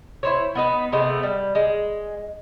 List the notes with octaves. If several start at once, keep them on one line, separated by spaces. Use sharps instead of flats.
E4 C5 C#5
B3 D#4 B4
C3 G#3 A3 B3
G3
G#3